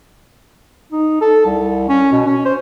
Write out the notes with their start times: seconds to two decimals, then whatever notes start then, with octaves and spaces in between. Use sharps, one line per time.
0.92 D#4
1.21 A4
1.46 C2
1.89 C#4
2.12 B2
2.26 C#4
2.45 C5